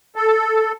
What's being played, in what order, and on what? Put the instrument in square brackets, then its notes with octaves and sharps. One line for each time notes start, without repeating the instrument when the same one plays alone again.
[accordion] A4